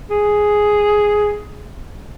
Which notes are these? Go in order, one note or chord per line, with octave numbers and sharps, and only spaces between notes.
G#4